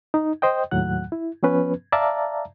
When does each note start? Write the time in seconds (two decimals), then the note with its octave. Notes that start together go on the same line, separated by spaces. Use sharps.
0.14 D#4
0.42 C5 D#5 G5
0.71 D#2 A2 F#3 F#5 F#6
1.12 E4
1.43 F3 B3 C#4 B4
1.92 D5 E5 F5 A5 A#5